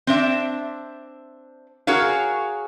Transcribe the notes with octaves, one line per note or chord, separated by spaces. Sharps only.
C4 D4 E5
F#4 G#4 A#4 C#5 F5